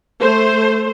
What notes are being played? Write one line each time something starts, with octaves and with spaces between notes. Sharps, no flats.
A3 C5